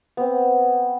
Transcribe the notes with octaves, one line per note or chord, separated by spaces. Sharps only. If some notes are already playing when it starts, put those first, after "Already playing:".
B3 C4